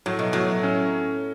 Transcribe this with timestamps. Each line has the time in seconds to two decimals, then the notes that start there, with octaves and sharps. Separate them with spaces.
0.06 A2 F#3
0.19 B2
0.33 A2 F#3
0.63 C#4